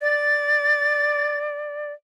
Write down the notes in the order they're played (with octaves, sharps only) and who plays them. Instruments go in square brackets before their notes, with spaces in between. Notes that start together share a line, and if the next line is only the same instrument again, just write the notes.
[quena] D5 [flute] A6